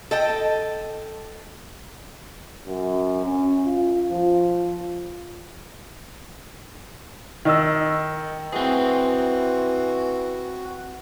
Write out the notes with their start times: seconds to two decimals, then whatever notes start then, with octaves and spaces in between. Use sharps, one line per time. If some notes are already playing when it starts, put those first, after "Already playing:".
0.11 A4 D#5 G5
2.67 F#2
3.25 C#4
3.65 F4
4.10 F3
7.45 D#3 D#5 E6
8.53 E3 C4 F#4 G#4